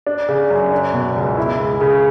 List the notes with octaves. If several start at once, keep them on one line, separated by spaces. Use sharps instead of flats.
D4
C#3
F#2
D4
B2
C#2
E4
G#3
C#3